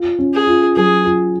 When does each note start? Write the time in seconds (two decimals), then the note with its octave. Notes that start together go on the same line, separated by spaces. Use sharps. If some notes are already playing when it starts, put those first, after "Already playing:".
Already playing: F4
0.19 C#4
0.34 G#4
0.47 F4
0.76 F#3 G#4
1.05 F4